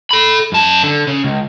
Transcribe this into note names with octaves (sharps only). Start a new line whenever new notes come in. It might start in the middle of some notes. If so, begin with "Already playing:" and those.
A4 B5
F#2 A5
D3
C#3
C#2